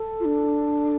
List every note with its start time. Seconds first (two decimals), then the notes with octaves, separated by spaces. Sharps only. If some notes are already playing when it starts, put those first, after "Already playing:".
Already playing: A4
0.20 F4
0.25 D4